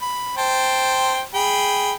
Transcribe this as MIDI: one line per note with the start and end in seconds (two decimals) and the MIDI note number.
0.02 0.34 83
0.37 1.21 72
0.37 1.21 79
0.37 1.21 81
1.34 1.93 68
1.34 1.93 79
1.34 1.93 83